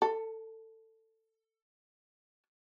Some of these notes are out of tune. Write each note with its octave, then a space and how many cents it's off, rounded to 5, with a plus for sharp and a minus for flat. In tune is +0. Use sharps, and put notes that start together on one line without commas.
A4 +20